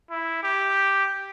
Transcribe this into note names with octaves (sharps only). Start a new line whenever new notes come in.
E4
G4